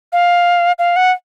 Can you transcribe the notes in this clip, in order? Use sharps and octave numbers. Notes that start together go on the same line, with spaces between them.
F5
F5
F#5